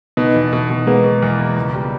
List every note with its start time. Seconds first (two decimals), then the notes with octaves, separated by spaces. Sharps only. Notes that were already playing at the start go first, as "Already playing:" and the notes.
0.17 B2 B3 D#4
0.35 E2
0.53 B2
0.70 B2
0.87 G#3 A#3 B3
1.04 B2
1.22 E2
1.39 A#3
1.56 C#2
1.74 G3